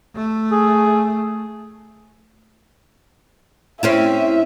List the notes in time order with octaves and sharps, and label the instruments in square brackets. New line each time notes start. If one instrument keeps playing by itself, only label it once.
[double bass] A3
[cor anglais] G#4
[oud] C4 C#4 E4 [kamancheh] E5